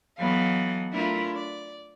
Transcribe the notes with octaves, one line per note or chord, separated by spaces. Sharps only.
E3 F#3 B3 A4 D#5 F5
A3 D4 E4 F4 A#4 E5
D5